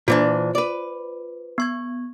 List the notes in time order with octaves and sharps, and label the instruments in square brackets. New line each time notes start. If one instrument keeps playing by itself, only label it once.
[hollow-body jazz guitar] A#2 E3 D4 [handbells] F4 C5
[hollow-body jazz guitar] B4 D5
[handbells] B3 C#6 G#6